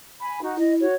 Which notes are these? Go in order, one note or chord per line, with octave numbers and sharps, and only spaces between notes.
G#5 B5
D#4 F#4
E4 D#5
F#4 C#5